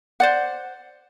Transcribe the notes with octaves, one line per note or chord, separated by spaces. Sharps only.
C5 D5 F#5